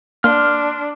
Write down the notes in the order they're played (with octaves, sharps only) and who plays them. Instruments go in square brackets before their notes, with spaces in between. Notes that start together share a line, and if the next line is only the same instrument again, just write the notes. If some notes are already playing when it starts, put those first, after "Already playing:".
[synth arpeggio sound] A#3 [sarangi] D4 [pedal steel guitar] C6 F6